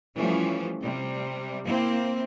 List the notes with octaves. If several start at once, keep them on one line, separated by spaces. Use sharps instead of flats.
E3 F3 G3 A3 C#4
C3 G3
A#3 C4 E4